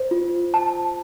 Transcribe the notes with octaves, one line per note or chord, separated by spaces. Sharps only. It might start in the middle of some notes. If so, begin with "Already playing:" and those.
Already playing: C5
F4
A5